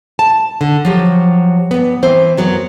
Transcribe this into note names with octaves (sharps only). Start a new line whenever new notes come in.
A5
D3
F3 F#3 G4
G2 B3
E3 C4 C5
F#2 F#3 B3